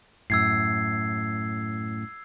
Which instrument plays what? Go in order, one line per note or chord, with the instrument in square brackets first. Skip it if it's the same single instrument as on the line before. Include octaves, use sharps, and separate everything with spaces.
[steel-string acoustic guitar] F#2 A2 [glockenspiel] E6 G#6 C7